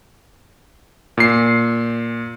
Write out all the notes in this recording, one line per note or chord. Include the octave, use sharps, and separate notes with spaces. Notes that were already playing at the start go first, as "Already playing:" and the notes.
A#2 C7